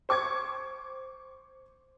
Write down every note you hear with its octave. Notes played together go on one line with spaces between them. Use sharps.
C5 C#6 D6 G#6